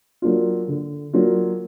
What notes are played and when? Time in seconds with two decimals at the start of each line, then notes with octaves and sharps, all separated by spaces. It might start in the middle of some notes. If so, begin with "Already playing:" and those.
0.22 F#3 A#3 D4 F4
0.68 D3
1.13 F#3 A#3 D4 F4